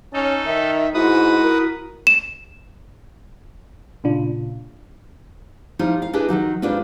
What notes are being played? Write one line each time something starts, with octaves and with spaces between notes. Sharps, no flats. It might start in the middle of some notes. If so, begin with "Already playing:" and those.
C#4 D#4 A4
D#3 E5
G#2 E4 F#4 B4 D#6
A#4
E7
A#2 C#3 D4 F4
F3 G3 D#4 E4
F5
D4 E4 G4 G#4 B4 D#5
D#3 E3 F#3 D#4
G#2 G3 D4 F4 B4